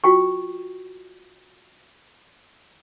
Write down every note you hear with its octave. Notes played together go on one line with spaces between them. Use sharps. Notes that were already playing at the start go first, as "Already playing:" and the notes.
F4 F#4 G5 C#6